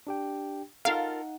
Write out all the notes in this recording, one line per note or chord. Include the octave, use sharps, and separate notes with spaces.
D4 G4 G5
D#4 F4 A4 A#4 F5 F#5